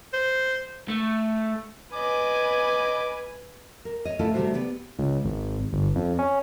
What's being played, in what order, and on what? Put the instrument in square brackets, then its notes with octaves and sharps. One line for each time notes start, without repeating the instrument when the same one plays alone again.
[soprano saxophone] C5
[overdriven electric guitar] A3
[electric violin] B4 G#5 [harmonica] D#5 D6
[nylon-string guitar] A#4
C#5 D#5
D#3 A3 C#4 E4 F4 A4
C3 D#3 G3 A3 F#4 C5
B3 G4 D5
[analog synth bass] C#2
G#1
G1
F2
C#4